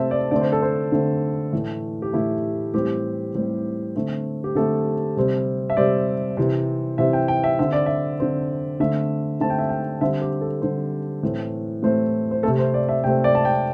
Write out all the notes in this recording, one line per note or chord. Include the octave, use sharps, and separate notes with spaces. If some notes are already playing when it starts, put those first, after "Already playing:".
Already playing: C3 A3 C4 E5 A5
D5
D3 A3 C4 D5
C5
A4
C5
D3 A3 C4
A2 E3 A3
G4
A2 E3 A3 E4
A2 E3 G3 C4 G4
A2 E3 G3 C4
D3 A3 C4
G4
D3 A3 C4 A4
C3 G3 C4
E5
C3 G3 C4 D5
C3 E3 C4
C3 E3 C4 E5
G5
G5
E5
D3 C4 E5
D5
E5
D3 C4
D3 A3 C4 E5
D3 A3 C4 A5
G5
E5
G5
D3 G3 C4 E5
G4
A4
D3 G3 C4 C5
A2 E3 A3 C4
A2 E3 A3 C4 C5
C5
C3 A3 C4 A4
C5
D5
E5
C3 A3 C4 G5
D5
A5
G5